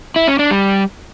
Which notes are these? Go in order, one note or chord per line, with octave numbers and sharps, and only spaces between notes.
E4
C#4
D4
G3